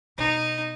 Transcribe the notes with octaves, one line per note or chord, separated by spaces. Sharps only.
B2 D#4